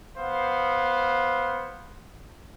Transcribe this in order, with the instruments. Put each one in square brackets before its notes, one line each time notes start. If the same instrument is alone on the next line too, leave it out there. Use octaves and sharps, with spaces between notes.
[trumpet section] B3 C5 F5